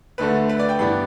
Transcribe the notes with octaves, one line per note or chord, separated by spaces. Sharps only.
D2 D3 A3 B4
B4
D5
G5
G2 E3 B3 D4 B5